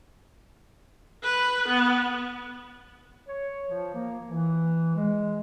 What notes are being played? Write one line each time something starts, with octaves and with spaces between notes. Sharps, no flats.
B4
B3
C#5
F3
A#3
E3
G#3